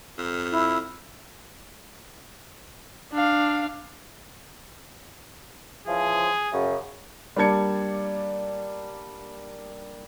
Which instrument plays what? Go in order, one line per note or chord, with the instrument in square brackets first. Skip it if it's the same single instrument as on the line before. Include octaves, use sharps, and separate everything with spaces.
[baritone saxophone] F2
[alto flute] E4
[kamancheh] D4 F5
[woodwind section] C#3 E3 F3 [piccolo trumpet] G#4
[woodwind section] F#2 C#3
[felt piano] G3 A#3 D4 A5 G#6 C#7